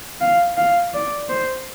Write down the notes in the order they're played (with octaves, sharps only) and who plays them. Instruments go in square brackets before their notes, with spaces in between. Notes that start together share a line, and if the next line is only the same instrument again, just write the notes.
[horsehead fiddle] F5
F5
D5
C5